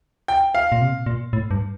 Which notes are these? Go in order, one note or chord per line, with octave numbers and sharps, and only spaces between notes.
G5
F5
A#2
C3
A#2
A2
G2